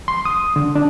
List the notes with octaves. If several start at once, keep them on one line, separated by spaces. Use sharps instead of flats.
C6
D#6
D3
D4